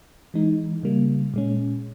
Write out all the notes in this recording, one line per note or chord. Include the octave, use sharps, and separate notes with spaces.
E3 G#3 D#4
C#3 G3 A#3
A#2 G#3 C#4